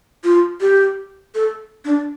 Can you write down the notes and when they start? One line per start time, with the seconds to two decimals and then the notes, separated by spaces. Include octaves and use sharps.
0.24 F4
0.61 G4
1.35 A4
1.85 D4